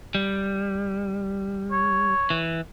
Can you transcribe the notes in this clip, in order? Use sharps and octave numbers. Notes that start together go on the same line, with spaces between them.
G3
C#5
E3